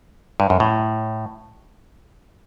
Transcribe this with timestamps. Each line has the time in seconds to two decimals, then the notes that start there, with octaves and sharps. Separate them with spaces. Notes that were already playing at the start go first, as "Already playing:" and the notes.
0.40 G2
0.50 F#2
0.60 A2